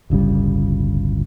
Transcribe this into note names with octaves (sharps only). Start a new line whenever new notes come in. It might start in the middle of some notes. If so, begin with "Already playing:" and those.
D1 G1 C#3 G3